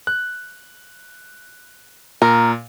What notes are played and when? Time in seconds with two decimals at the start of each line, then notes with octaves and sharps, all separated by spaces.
0.07 F#6
2.22 A#2 A#4